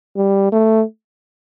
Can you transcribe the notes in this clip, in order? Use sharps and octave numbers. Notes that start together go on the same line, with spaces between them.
G3
A3